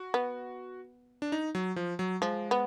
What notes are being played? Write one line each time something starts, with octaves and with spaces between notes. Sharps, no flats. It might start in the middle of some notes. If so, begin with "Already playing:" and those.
Already playing: F#4
B3
D4
D#4
F#3
F3
F#3
F3 G#3
B3